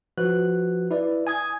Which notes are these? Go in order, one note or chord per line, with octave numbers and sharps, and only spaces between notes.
F3 F#4 B4 F#6
E4 B4 D5
G#5 D#6 G#6